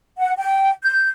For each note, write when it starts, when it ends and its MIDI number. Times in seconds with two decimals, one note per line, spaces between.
0.18 0.32 78
0.37 0.69 79
0.83 1.07 91